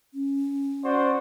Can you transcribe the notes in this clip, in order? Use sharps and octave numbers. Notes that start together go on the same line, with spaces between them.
C#4
F#4 C5 D5